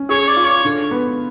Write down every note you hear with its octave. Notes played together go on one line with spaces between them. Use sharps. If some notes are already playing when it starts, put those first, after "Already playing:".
Already playing: C#4
G#4 C#5
D5
F4
C#5
D3
B3